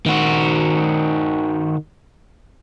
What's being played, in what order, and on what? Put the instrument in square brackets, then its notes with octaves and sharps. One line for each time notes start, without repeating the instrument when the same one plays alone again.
[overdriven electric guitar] D#3 F#4